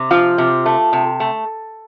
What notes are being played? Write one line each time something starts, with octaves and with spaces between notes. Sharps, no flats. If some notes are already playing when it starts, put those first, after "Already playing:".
Already playing: C3
F3 F4 F5
C3
A3
C3
A3